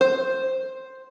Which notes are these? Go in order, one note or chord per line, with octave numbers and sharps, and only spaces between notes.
C5